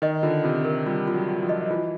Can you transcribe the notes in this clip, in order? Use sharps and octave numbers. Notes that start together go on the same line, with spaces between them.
D#3 D#5
D3 F4
C3 F4
A#4
G3 F4
F4
F#3
F4
F3
D#5
E3 F4